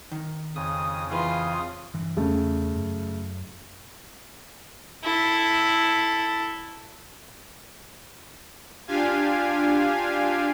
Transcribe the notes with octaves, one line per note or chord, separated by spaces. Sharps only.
D#3
F2 C#3 D#6
E3 F4 G#4 B4
G2 E3
E2 C#3 G3 A3
F#2
E4 A4
D4 F4 G4 F5 G#5